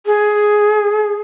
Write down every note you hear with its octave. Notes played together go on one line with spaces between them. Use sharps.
G#4